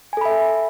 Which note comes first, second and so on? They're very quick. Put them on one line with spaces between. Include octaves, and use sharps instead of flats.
G#5 A4 B5 E5